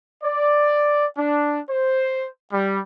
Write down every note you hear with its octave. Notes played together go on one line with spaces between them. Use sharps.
D5
D4
C5
G3